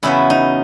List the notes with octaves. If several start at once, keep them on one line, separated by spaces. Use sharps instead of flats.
E2 C#3 F#3 B3 E4
D#4